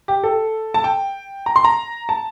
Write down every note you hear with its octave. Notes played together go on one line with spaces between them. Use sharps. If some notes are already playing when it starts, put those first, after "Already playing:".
G4
A4
A5
G5
A#5
C6
A#5
A5